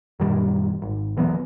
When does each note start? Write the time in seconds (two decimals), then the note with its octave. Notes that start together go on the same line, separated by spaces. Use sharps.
0.20 F#2 A#2 D#3 G3
0.82 G#1
1.17 E1 E3 F#3 B3